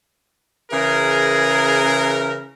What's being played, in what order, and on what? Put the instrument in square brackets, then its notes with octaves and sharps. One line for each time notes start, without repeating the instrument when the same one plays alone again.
[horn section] C#3 E3 A#4 [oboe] G#4